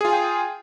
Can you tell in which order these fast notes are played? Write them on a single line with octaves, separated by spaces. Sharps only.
G#4 F4 G#5 G5